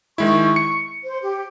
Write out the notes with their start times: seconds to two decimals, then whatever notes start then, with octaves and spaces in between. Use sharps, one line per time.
0.18 D#3 G#3 E4 C#6
0.56 C#7
1.03 C5
1.22 G4